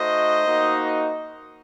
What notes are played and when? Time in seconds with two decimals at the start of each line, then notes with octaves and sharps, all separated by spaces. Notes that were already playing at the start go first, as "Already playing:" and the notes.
Already playing: A3 D#4 F#4 C5 D#5
0.46 A#3 D#4 F#4